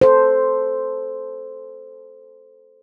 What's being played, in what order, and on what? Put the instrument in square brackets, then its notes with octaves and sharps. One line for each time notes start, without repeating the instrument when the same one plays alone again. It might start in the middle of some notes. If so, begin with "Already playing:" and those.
[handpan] A4 C5